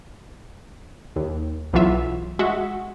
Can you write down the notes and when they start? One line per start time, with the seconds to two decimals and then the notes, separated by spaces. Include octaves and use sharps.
1.16 D#2
1.73 B1 E3 F#3 F4 E5
2.39 G#3 F#4 E5 F#5